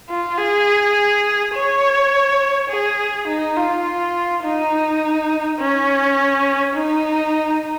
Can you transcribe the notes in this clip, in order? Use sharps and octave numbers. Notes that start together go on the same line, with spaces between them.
F4
G#4
C#5
G#4
D#4
F4
D#4
C#4
D#4